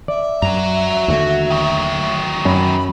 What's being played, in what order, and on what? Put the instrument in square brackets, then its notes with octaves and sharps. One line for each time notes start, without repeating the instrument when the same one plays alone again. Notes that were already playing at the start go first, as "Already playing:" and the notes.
[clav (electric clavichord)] D5 [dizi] E5
[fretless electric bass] F#2 [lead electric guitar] F#4 A#5
[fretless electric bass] D#2 D3 A3
[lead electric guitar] D#3 F#3
[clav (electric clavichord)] F#2 [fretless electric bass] C#4 [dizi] B5